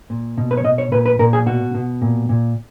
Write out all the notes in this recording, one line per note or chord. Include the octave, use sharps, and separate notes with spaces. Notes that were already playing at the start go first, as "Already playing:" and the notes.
A#2
B2
B4
C#5
B2 D#5
C#5
A#2 B4
B4
A#2 A#4
G#4
B2 F#4
B2
A#2
A#2